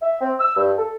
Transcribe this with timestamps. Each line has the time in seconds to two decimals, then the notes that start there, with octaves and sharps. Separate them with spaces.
0.02 E5
0.21 C4
0.39 E6
0.57 G2
0.78 A4